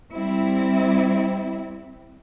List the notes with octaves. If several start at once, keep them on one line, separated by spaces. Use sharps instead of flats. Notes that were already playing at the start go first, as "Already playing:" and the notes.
G3 C4 E4